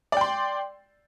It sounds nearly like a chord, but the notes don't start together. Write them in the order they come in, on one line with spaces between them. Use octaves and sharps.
D5 G5 C6